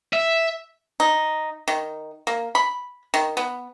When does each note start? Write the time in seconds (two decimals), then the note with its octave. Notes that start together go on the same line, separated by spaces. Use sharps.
0.13 E5
1.00 D#4
1.68 D#3
2.27 A#3
2.55 B5
3.14 D#3
3.37 B3